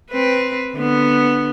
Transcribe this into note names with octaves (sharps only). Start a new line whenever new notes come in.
C4 B4
D3 B3